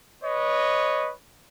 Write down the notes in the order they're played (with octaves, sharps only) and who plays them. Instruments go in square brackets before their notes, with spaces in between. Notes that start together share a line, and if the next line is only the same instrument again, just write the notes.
[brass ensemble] B4 C#5 D#5